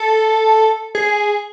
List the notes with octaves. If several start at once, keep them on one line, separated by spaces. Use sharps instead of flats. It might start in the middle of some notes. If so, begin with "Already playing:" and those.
Already playing: A4
G#4